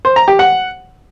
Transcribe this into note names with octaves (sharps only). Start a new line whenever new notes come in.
C5
A#5
G4
F#5